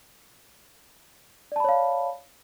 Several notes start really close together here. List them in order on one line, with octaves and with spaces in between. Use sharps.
D5 A5 B5 C#5 F5